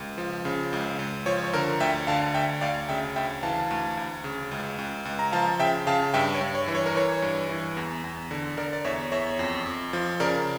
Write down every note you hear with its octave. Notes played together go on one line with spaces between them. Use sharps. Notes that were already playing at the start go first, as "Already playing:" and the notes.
Already playing: C#2
F3
C#3
C#2
C#2
F3 C#5
C#5
D3 A#4
D2 E5 G5
D3 F5 A5
D2 E5 G5
D2 D5 F5
C#3 E5 G5
D2 E5 G5
E3 F5 A5
D2
D2
C#3
C#2
C#2
C#2
A#5
F3 F5 A5
C#3 E5 G5
C#3 F5 A5
G2 E5 G5
C#5
G2
C#5
E3
C#5
A#4
E3 C#5
G2
E3
E2
E2
D3
D3 A#4 D5
D5
E2 C#5 E5
E2 C#5 E5
F2
F2
F3
C#3 A#4 D5